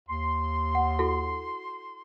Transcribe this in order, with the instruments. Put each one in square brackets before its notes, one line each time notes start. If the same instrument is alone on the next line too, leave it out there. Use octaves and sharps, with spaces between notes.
[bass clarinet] D#2 [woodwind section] C6
[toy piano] F#5
E4 F#4 A4